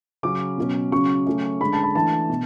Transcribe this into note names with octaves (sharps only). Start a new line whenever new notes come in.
C#3 F#3 C#4 D6
B2 F#3 C#4
C#3 F#3 C#4 C#6
C#3 F#3 A3 C#4
D3 G#3 C#4 B5
A5
B5
E3 A3 D4 A5
B2